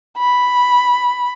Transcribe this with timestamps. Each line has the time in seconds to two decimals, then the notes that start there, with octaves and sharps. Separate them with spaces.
0.18 B5